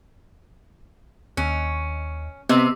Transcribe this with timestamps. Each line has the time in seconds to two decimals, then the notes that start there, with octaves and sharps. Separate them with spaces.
1.37 D#2 C#4
2.49 C3 B3 D#5 E6